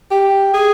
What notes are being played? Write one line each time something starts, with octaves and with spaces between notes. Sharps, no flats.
G4
G#4